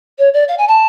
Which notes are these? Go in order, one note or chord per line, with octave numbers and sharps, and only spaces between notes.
C#5
D5
F5
G#5
A5